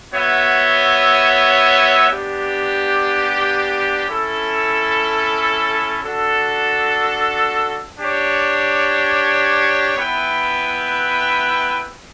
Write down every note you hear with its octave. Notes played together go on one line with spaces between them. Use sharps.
B3 F#4 C#5 E5
B3 D4 G4
C#4 E4 A4
D4 F#4 A4
D4 G4 C#5
B3 E4 B4 E5 G5